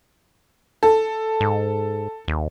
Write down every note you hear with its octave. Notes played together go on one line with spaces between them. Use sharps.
A4
G#2
D#2